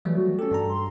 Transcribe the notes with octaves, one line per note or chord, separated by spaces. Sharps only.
E3 F#3 G3 A3
F#4
C#4 G4 A4
G2 D4 A#5
C6